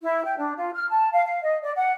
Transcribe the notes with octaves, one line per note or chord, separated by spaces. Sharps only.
E4
G5
D4
F4
F6
A5
F5
F5
D#5
D5
F#5